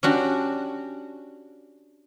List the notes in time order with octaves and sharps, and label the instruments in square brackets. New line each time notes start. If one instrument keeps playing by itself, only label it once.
[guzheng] C#4 D4 F#4 G4